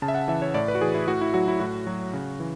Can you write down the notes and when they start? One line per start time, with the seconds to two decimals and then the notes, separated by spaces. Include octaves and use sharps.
0.02 C#3 A5
0.08 E5
0.15 F#5
0.28 E3 E5
0.42 C#5
0.54 A2 D5
0.68 B4
0.75 F#4
0.81 E3 G#4
0.95 E4
1.08 A2 F#4
1.21 E4
1.34 F#3 F#4
1.48 E4
1.60 A2 F#4
1.87 F#3
2.13 C#3
2.40 E3